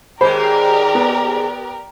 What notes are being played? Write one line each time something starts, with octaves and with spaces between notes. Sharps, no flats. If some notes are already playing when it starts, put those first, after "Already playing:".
D#2 G#2 G#3 G4 A#4 C5 D5 B5
B3